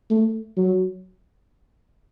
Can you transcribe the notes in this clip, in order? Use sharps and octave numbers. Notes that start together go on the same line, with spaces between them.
A3
F#3